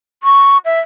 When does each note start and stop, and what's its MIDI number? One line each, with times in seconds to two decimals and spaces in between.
0.23 0.57 85
0.65 0.79 76